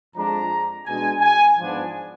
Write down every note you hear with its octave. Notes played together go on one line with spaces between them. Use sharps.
F2 F3 G#3 D4 A#5
B2 G#3 D4 G#5
G#5
G#2 F3 B3 D4